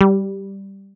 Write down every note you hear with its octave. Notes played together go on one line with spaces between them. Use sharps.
G3